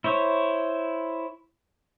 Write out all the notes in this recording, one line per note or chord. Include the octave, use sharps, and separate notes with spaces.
E4 C5 C#5